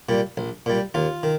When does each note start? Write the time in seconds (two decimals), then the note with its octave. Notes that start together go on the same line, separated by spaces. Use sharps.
0.09 A#2 G3
0.37 A#1
0.66 A#2 G3
0.94 D#2 F4
1.23 D#3